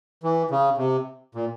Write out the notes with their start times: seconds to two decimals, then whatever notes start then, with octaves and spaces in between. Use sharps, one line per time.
0.24 E3
0.51 C#3
0.78 C3
1.35 A#2